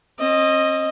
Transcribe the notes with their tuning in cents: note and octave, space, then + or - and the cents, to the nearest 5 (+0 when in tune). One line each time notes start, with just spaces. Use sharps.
C4 +45 D#5 +0